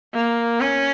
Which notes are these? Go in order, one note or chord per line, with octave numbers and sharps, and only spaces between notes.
A#3
C#4